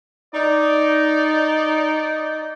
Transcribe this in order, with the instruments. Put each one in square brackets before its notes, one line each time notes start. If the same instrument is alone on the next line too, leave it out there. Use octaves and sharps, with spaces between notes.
[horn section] D#4 D5